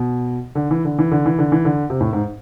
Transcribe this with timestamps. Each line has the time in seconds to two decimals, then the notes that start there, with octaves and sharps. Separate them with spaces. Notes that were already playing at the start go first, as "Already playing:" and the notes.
Already playing: B2
0.55 D3
0.71 E3
0.85 D3
0.99 E3
1.11 D3
1.26 E3
1.38 D3
1.52 E3
1.65 D3
1.90 C3
2.01 A2
2.13 G#2